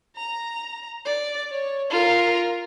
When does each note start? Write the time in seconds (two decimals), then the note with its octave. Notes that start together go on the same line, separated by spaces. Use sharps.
0.16 A#5
1.05 D5
1.50 C#5
1.90 F4 A#4